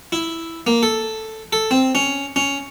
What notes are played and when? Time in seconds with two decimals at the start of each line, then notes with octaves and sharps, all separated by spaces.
0.12 E4
0.67 A#3
0.83 A4
1.53 A4
1.71 C4
1.95 C#4
2.36 C#4